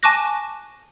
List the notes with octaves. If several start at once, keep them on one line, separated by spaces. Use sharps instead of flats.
G#5 A5 C#6 D6 F#6 A#6